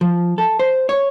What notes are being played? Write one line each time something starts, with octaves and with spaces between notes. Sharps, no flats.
F3
A4
C5
C#5